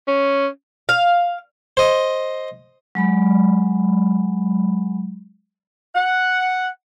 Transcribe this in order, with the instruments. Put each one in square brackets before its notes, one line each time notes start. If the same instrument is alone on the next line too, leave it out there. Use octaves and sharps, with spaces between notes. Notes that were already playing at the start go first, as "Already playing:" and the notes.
[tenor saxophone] C#4
[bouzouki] F5
[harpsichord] C5 D#5
[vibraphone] F#3 G#3 B5
[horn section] F#5